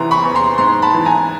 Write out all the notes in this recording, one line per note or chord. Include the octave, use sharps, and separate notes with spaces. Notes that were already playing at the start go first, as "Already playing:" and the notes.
Already playing: E2 C3 E3 A#5 C6
B5 C#6
E2
A#5 C6
G#2 A#5 C6
A5 B5
E3
G#5 A#5